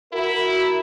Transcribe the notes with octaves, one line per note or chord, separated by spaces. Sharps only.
E4 F#4 A#4